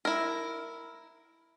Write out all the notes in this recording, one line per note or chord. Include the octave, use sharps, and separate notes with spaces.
E4 A#4